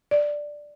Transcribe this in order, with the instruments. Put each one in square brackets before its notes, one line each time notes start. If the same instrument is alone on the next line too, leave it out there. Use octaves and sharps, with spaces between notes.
[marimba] D5